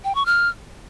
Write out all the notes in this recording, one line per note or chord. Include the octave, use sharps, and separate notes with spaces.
G5
C#6
F6